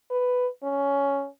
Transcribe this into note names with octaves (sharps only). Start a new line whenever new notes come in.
B4
C#4